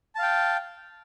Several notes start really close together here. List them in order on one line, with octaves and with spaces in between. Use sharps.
A5 F5 G5